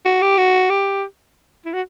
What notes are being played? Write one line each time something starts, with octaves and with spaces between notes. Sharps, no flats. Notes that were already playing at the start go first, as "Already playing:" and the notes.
F#4
G4
F#4
G4
E4
F#4